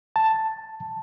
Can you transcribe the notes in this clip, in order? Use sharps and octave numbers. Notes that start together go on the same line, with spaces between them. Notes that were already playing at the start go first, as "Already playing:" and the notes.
A5